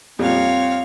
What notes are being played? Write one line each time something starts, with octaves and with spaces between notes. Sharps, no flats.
F2 A#2 G3 C4 C#5 F5